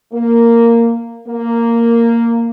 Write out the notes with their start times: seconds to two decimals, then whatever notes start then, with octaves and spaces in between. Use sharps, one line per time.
0.13 A#3
1.28 A#3